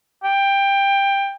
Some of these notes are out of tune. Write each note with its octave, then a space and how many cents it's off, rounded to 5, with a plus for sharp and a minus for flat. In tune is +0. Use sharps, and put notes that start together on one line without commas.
G5 +15